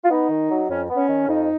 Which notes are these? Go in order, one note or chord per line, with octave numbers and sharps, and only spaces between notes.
F4
B3 D#4
D#3
F#3
F2 C#4
B3
C#4
D#3
F2 D#4